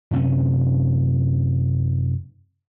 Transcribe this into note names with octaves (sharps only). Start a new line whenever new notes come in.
F#2 C3 C4 C#4